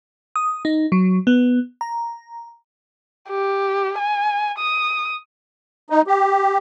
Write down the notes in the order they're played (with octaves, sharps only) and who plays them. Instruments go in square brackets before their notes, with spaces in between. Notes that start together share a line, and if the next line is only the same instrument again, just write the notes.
[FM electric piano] D#6
D#4
F#3
B3
A#5
[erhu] G4
G#5
D#6
[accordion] D#4
G4